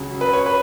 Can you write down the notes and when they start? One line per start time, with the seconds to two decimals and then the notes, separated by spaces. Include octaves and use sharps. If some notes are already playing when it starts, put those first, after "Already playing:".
Already playing: C#2 C#3 F#3 C#4
0.21 B4
0.33 C#5
0.46 B4